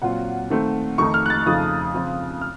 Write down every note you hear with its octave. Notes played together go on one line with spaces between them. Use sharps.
A#2 F#3 C4 F4 F#5
D#3 A3 C4
F2 D#3 A3 D#4 C#6
F6
F#6
A6
F2 C#3 F3 A3 D#4 D#6
C#3 F3 C4 F4
F6